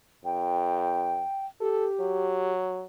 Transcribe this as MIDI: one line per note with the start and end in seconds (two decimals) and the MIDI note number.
0.25 1.23 41
0.25 1.46 79
1.60 2.53 67
1.60 1.87 69
2.00 2.84 54